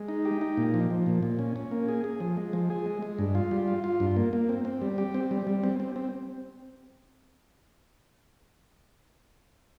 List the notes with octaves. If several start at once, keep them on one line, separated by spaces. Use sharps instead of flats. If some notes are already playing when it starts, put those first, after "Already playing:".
Already playing: G#3
D#4
G4
D#4
A#2
F3
F3
A#2
A#2
C#4
C#4
A#3
G#4
G#4
F3
G#3
F3
G#4
G#3
G#3
G2
F4
G3
F4
F4
G2
A#3
A#3
C4
C4
G3
G4
C4
G3
G3
C4
C4
C4